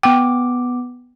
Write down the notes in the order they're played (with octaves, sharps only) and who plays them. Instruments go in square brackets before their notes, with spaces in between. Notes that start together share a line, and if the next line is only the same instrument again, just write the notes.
[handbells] B3 D6 [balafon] G5